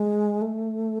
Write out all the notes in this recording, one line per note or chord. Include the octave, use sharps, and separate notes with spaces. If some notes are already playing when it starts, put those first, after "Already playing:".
Already playing: G#3
A3